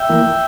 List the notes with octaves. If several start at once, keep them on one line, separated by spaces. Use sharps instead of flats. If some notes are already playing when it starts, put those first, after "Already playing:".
Already playing: E5 G5
E3 A#3